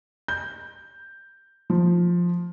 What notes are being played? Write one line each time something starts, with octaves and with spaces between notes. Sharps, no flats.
G6
F3